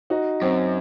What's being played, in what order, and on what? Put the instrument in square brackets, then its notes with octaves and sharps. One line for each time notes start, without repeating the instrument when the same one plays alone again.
[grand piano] D#4 F#4
[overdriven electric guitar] F#2 [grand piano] C4